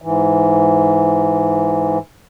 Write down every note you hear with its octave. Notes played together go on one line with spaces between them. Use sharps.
G#2 E3